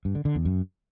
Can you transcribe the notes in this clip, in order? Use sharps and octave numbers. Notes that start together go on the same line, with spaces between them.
G2
D3
D3
E2
F#2